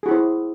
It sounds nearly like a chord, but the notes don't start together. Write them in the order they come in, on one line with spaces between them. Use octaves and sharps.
G#4 F#4 E4 C5